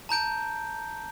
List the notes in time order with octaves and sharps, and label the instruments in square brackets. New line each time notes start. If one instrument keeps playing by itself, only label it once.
[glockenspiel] A5 A#5 G6 D7